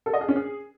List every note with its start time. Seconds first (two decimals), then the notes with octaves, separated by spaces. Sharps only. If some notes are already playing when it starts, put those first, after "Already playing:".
0.06 A4
0.14 D#5
0.21 G#4
0.28 C#4
0.36 G#4